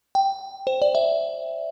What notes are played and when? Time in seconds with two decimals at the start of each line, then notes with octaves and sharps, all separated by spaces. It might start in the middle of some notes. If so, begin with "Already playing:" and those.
0.15 G5
0.67 C5
0.82 D5
0.95 E5